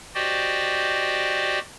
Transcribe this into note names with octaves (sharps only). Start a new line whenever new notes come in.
F#4 G4 C5 D5 D#5 G5